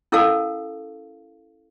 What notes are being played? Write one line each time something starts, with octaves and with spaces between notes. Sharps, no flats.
C#4 E4 A4 A#4 F5 A5